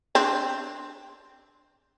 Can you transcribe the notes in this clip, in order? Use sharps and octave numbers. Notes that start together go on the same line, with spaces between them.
C4 D4